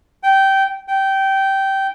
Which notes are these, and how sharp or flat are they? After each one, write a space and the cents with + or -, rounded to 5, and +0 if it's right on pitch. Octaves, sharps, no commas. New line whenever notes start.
G5 -15
G5 -15